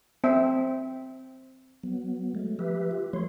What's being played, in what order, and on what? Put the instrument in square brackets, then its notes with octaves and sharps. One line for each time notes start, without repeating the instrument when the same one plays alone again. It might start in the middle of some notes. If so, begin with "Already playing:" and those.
[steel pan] C4 E5
[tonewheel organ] F#3 B3
F#3 G#3 A3
F3 G4 B4 E5
F4 G4
F3 F#3 A3 C#5 C6